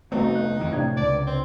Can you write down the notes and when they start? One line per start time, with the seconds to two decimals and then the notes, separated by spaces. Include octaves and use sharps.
0.12 F1 A3 B3 C4 D#4 F#4
0.35 F#6
0.59 F2 D#3 E3
0.73 A2 C3 D4 G#6
0.97 C#2 D5
1.27 C4